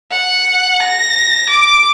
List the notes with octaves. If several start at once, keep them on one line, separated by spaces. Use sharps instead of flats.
F#5
A#6
D6